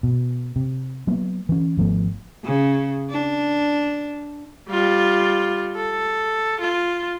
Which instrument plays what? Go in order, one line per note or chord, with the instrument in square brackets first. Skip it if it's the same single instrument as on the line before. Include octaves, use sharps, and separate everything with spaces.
[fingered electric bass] B2
C3
F#3 A#3 B3
E3 C#4
G#1 F3 A3 B3
[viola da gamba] C#3
D4
[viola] G3 F4
A4
F4